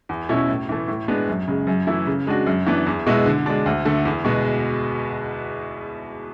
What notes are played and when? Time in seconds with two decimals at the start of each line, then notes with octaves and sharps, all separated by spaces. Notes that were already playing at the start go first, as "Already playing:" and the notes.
0.09 E2
0.29 B2 A3 C#4 E4
0.49 A2
0.69 E3 A3
0.88 A2
1.08 G#3 B3 D4
1.29 F#2
1.48 C#3 G#3
1.67 F#2
1.87 E3 A3 E4
2.07 C#3
2.27 G#3 D4 F#4
2.47 F#2
2.67 E3 B3 D4
2.87 E2
3.06 B2 G#3 B3 E4
3.26 D3
3.46 G#3 D4
3.66 D2
3.85 D3 A3
4.05 E2
4.25 B2 G#3 B3